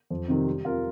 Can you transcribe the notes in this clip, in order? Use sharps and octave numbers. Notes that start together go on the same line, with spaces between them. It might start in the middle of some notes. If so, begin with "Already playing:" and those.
F2
C3 D#3 G3 C4
G3
C4 F4 A#4